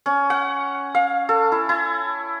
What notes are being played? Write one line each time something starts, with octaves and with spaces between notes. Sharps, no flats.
C#4
F#5
F5
A4
E4
E4